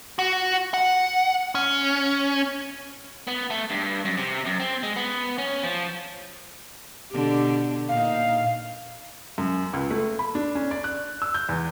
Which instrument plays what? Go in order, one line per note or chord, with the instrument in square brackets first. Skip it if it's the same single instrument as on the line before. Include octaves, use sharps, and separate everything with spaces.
[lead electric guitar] F#4
F#5
C#4
B3
A3
G2
F#2
C3
F#2
C4
G#3
B3
C#4
F3
[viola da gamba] B2 D3 G4
[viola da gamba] A#2 D#4 [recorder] F5
[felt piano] F#2
C#2
A3
B5
D4
C#4
D5
F#6
E6
G6
E2